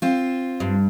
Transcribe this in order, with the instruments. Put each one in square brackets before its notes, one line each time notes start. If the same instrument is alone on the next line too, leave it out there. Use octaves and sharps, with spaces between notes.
[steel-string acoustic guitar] C4 F4
[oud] G2